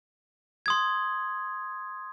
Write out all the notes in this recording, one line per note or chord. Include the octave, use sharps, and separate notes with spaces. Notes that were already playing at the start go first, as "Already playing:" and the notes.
C6 D#6 G#6